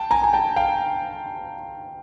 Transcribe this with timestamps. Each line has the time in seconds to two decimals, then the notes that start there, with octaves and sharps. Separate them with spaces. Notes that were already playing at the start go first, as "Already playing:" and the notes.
Already playing: G5 A5
0.11 G#5 A#5
0.24 G#5
0.33 G5 A5
0.56 F5 G5